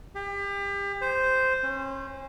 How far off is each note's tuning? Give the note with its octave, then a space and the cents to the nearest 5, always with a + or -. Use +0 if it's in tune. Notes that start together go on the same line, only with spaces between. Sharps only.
G4 +35
C5 -10
C#4 -40